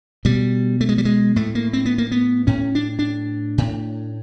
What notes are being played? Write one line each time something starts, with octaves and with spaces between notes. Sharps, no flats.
B2 G3
A3
G#3
G3
G#3
A2 A3
A#3
C4
B3
A#3
B3
A2 C#4
D4
D4
A2